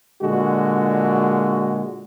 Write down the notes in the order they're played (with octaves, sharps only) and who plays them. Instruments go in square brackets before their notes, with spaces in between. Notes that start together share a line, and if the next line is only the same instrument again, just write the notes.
[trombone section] A#2 D3 G#3 F#4